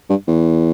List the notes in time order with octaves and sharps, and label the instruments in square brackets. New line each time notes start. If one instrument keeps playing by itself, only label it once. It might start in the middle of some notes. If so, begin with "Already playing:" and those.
[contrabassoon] G2
E2